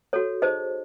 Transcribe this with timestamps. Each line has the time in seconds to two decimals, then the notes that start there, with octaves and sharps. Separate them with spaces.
0.13 F#4 A4 C#5
0.42 D#4 G#4 C5 D#5